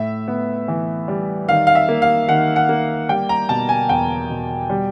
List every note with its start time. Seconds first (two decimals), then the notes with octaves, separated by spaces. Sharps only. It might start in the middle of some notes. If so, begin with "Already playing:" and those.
Already playing: A2 E5
0.28 B3
0.68 E3
1.08 G3
1.48 D#3 F5
1.67 F5
1.75 E5
1.88 A#3
2.02 F5
2.28 D#3 F#5
2.56 F#5
2.69 A#3
3.09 G3 G5
3.29 A#5
3.49 B2 A5
3.69 G#5
3.89 E2 G5
4.30 B2
4.70 G3